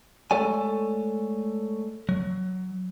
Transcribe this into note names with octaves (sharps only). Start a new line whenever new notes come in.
G#3 A3 A4 C#5 D5 G#5
F#3